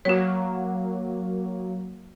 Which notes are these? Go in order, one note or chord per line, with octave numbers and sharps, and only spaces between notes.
F#3 A#3 F#4 C#5